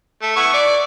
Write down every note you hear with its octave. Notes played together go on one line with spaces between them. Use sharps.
A3
B3 E4 C#6
D5